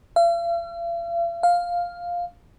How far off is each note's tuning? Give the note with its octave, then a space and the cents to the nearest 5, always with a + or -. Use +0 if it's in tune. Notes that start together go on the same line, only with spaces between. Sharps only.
F5 -45
F5 +5